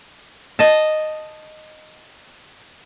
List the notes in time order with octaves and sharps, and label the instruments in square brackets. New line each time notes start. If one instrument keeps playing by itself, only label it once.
[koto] D#5 A5